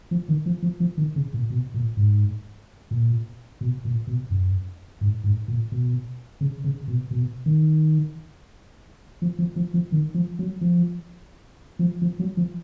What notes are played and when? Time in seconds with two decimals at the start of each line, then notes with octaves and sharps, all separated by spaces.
0.11 F3
0.29 D#3
0.46 F3
0.62 F3
0.80 F3
0.98 D#3
1.16 C#3
1.34 A#2
1.50 B2
1.74 A#2
1.97 G#2
2.91 A#2
3.61 B2
3.85 A#2
4.07 B2
4.30 F#2
5.01 G#2
5.24 G#2
5.48 A#2
5.72 B2
6.41 C#3
6.64 C#3
6.88 B2
7.11 B2
7.46 D#3
9.22 F3
9.39 F3
9.56 F3
9.74 F3
9.92 D#3
10.15 F3
10.39 F#3
10.61 F3
11.79 F3
12.02 F3
12.20 F#3
12.37 F3